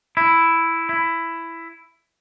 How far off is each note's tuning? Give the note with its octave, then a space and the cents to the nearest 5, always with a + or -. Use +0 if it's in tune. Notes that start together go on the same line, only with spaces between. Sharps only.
E4 +5
E4 +10